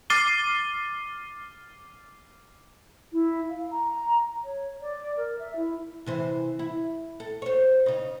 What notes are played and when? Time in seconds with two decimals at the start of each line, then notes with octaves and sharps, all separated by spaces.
0.10 D6 F6 A6 C7 D#7 G7
3.13 E4
3.50 F5
3.71 A#5
4.44 C#5
4.81 D5
5.17 A#4
5.39 E5
5.56 E4
6.06 C3 E3 C5
6.59 E4
7.20 A4
7.42 C5 C#5
7.86 C#3 D#4